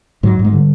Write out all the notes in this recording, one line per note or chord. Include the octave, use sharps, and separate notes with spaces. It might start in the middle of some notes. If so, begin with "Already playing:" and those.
G#2 F#3
G#2
G#3
D3 G3